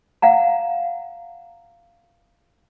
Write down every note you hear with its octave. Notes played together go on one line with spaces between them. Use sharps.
F5 F#5 A#5